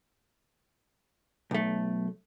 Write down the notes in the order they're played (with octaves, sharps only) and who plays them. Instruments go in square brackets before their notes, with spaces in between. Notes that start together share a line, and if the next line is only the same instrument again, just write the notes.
[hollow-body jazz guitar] B1 A3